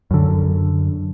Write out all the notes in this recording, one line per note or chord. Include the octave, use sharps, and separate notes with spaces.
F#2 D3